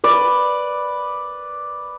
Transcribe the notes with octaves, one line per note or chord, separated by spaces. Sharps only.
B4 D5